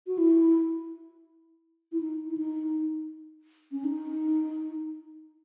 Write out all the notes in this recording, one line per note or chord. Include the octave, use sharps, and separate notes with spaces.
F#4
E4
E4
D#4
E4
D#4
C#4
D#4